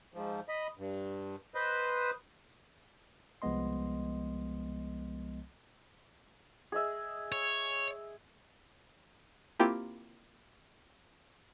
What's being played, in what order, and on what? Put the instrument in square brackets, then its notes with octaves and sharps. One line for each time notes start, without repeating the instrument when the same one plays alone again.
[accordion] G#2 F3
D#5 B5
G2
B4 C5 D#5
[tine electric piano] C2 F3 G#3 B3 D#5 C6
[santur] G#4 D#5 E5
[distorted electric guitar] C#5
[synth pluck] A#3 C4 E4 F4 G4 G5